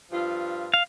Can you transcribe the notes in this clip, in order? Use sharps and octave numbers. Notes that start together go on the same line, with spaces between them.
G2 F3 F4
F5